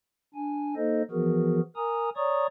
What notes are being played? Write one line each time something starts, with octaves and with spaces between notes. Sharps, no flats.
D4 G#5
A#3 D#4 A4 C5 D#5
E3 F3 B3 F#4 G#4 A#4
A#4 G#5 A#5 D#6
C#5 D5 A#5 C#6 D#6